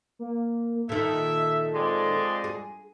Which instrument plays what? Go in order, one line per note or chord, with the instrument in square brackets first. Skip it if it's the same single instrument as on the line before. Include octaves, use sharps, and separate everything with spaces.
[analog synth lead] A#3
[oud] A#2 D#3 [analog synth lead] A4 [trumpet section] E5
[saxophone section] F2 G#3 [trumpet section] C5 D5
[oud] G#4